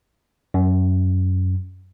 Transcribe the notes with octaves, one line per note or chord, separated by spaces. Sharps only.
F#2